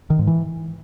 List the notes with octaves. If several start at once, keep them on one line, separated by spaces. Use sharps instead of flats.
D#3
G#2
E3